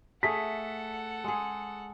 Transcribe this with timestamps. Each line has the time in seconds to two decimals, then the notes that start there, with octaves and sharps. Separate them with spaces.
0.23 A3 G#4 A4 F5 F#5 B6
1.24 G#3 G#4